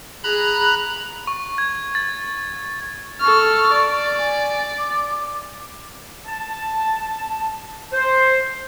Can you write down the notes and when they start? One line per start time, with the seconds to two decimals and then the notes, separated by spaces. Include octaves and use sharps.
0.24 G#4 A#5 B5 F#6
1.27 C#6
1.58 G#6
1.95 A6
3.21 A4 C#6 F6
3.72 D5
4.18 G#5
4.78 D6
6.27 A5
7.92 C5